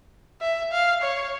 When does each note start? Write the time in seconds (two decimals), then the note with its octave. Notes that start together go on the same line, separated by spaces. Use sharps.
0.41 E5
0.72 F5
1.02 C#5